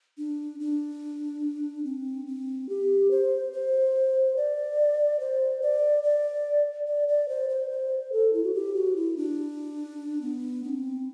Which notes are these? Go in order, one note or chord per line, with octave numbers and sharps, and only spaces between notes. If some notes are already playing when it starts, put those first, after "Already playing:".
D4
D4
C4
C4
G4
C5
C5
D5
C5
D5
D5
D5
D5
C5
C5
C5
A4
E4
F#4
G4
F#4
E4
D4
B3
D4
C4